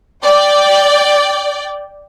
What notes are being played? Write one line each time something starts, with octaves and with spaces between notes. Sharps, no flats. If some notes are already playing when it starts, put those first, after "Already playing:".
D5 G5